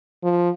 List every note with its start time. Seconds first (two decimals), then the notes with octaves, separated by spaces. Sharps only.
0.24 F3